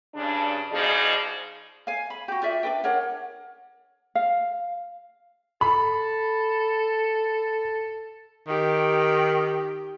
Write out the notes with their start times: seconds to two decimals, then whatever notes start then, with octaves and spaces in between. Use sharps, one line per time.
0.15 G2 C#3 D4
0.73 B2 F3 D#4 G#4 D5
1.87 F5 G#5
2.10 B5
2.28 F#4 G4
2.43 F4 D5 E5
2.63 D4 B4 G5
2.84 D4 A#4 C#5 F#5
4.15 F5
5.61 A4 B5
8.48 D#3 G4